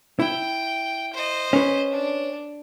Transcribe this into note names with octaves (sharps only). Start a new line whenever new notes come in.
E4 G5
C5 D#5
C#4 B4
D4